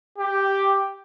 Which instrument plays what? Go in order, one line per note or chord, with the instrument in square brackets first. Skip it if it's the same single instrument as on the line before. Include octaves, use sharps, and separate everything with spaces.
[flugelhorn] G4